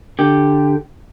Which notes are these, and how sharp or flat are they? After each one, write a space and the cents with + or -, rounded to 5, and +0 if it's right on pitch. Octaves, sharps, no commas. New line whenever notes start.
D3 +0 G4 +0